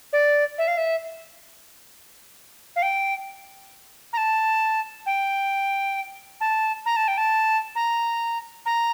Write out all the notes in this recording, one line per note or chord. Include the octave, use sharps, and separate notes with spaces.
D5
E5
F5
E5
F5
G5
A#5
A5
G5
A5
A#5
A5
G5
A5
A#5
A#5